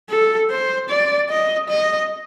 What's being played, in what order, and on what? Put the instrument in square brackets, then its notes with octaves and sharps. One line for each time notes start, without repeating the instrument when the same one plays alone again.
[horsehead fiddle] A4
C5
D5
D#5
D#5